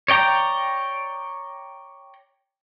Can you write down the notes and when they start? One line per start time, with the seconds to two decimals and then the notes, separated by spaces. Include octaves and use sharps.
0.08 C#5 D5 G5 A#5